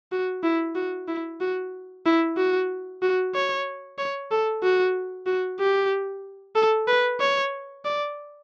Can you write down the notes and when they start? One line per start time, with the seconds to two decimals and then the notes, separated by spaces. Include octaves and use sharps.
0.12 F#4
0.43 E4
0.75 F#4
1.08 E4
1.41 F#4
2.06 E4
2.37 F#4
3.02 F#4
3.34 C#5
3.98 C#5
4.31 A4
4.63 F#4
5.27 F#4
5.59 G4
6.55 A4
6.88 B4
7.20 C#5
7.85 D5